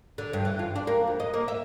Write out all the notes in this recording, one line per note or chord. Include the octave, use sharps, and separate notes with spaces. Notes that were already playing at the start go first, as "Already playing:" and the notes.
D3
G2
E3
F4
D4
A#3
F2
D#5
A#3
E5